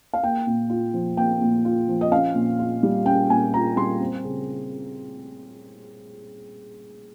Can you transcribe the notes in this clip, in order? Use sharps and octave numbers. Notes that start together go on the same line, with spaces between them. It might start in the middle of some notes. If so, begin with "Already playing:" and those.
F5
A#3 G5
A#2
F4
F3
A#3 G5
A#2
F4
F3
D#5
C#4 F5
A#2
F4
G3
C#4 G5
A#2 G#5
F4 A#5
G3 C6
C4
C#3